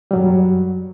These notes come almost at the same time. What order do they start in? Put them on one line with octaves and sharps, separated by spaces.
G3 F#3 F#2